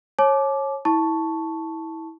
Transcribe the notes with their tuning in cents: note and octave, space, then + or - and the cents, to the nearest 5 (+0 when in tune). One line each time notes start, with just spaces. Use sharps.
C#5 -25 A5 -40 D6 +0
E4 -25 A5 +0 C#6 +0